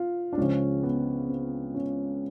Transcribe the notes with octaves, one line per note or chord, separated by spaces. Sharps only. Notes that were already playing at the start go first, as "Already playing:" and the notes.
Already playing: F4
D4
C#2 C#3 F3 C#4
B3
C4
C#4